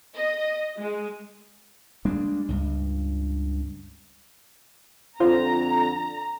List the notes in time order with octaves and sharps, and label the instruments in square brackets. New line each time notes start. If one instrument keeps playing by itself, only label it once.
[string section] D#5
G#3
[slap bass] G3 G#3 A#3 D4
C#2 G2
[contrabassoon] F2 [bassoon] D3 [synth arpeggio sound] F4 C5 [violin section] A#5